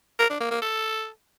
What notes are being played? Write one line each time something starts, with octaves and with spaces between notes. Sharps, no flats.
A#4
D4
A#3
A#3
A4